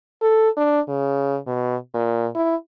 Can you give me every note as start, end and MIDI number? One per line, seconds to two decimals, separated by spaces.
0.22 0.49 69
0.57 0.80 62
0.89 1.37 49
1.47 1.76 47
1.94 2.27 46
2.35 2.55 64